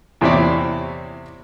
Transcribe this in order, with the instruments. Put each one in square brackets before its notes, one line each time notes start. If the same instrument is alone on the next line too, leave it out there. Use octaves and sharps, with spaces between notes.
[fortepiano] E2 C3 C4 E4 C#5 D5